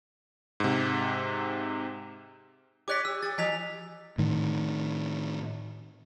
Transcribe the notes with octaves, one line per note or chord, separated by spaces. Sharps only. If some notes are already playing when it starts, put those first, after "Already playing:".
G#2 C3
G4 C#5 D5 D6 F#6 B6
G4 E6
G4 A6
E3 G#5 B6 F7
A2 D#3